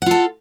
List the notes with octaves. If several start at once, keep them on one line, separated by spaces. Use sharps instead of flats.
F4 A4 F#5